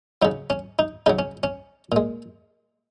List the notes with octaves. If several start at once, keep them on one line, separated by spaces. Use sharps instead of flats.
C#3 F#3 D#4
C#4
D#4
C#3 F#3 D#4
C#4
C#4
A#2 G#3